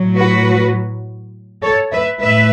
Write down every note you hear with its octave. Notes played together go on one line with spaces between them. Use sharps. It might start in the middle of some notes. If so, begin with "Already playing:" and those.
Already playing: A2 F#3
F#4 B4
A4 C#5
B4 E5
A2 B4 E5